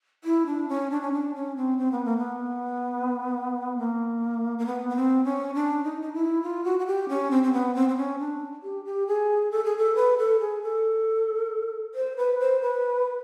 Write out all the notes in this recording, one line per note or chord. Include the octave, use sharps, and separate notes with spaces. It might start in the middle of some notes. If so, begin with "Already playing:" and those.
E4
D4
C#4
D4
C#4
D4
C#4
C4
C4
B3
A#3
B3
A#3
A#3
B3
B3
C4
C#4
D4
D#4
D#4
E4
F4
F#4
F#4
G4
C#4
C4
C4
B3
C4
C4
C#4
D4
G4
G4
G#4
A4
G#4
A4
B4
A4
G#4
A4
C5
B4
C5
B4